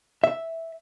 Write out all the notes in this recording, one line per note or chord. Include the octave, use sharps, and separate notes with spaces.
E5